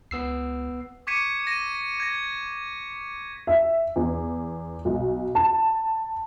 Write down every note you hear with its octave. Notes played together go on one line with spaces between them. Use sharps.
C#2 B3 E6 C7
C#6 D6 G#6 B6 C#7 D#7
A#6 D#7
G#6 A#6
E5
E2
B1
A5